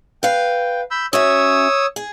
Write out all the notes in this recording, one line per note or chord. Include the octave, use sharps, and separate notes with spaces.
B4 F5 G5
B5 E6 G6
C#4 F#4 C#5 E5 D#6 E6
G#4